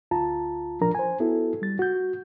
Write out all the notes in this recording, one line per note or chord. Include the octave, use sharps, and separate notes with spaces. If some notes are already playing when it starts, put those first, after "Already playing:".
D2 F4 A5 A#5
A#2 F3 D4 A#4 A#5
C5 G#5
B3 E4 F#4 A4
G3 A6
F#4 G6